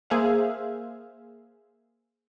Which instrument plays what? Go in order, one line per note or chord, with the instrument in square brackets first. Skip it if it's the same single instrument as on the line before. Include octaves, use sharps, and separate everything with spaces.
[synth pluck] A#3 G#4 C5 E5 F5